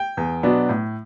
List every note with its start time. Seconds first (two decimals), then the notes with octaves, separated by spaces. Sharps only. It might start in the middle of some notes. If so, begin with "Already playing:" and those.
Already playing: G5
0.17 E2
0.43 B2 F#3 B3 D4
0.69 A2